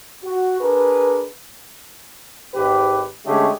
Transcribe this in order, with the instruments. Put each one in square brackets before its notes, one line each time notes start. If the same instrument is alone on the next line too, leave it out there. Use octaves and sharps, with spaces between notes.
[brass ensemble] F#4
D4 G#4 A#4 B4
[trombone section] G#1 G4 B4
D3 G#3 A3 C#4 G4 G#4